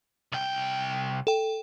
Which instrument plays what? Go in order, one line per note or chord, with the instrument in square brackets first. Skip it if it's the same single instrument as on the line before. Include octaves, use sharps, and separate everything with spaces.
[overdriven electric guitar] C2 G5
[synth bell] A4 G5